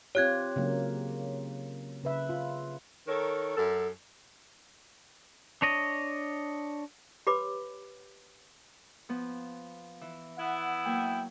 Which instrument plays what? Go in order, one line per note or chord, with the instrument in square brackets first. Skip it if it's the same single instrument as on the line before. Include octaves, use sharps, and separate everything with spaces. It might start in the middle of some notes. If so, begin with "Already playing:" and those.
[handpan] C4 F4 G4 [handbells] C#5 F#6 G#6
[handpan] C#3 F#3 A#3
C#3 B4 E5
F4
[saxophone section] D#3 A4 A#4 C#5
F#2 A4
[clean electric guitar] D4 C#5 D#5
[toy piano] G4 B4 C#5 B5 D6
[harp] F3 B3
E3
[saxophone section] B3 E4 [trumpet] F#5
[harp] F#3 A#3 [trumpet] G5